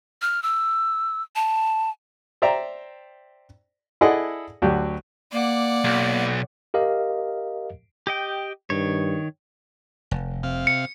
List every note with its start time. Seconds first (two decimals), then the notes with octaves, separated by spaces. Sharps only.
0.22 F6
0.43 E6
1.36 A5
2.42 C5 D5 E5 G5 A#5
4.01 E4 G#4 A4 D5 D#5 F#5
4.62 D2 F#3 F#4 G4
5.32 A#3 D5 F#5
5.84 B1
6.74 G4 A#4 D#5 F5
8.07 G4 D#5 G5
8.70 G2 D#3 C#5
10.11 F1
10.43 C3 F5
10.67 C#7